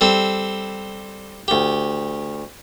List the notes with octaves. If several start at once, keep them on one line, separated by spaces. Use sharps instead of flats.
G3 C4 A4
D2 G4